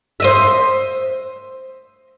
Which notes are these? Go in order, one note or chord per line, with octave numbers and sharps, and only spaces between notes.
C5 D#5 E5